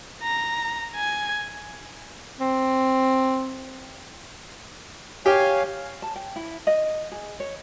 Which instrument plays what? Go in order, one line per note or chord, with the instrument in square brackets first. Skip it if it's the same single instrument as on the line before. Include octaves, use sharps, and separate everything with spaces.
[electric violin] A#5
G#5
[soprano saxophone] C4
[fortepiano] G4 [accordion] C#5 F5 G#5
[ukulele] A5
G5
E4
D#5
G#4
C#5